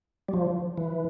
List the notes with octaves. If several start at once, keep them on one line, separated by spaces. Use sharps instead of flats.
G3
F3
E3